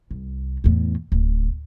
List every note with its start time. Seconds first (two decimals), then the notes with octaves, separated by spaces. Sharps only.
0.11 C2
0.64 E2 A2
1.12 D1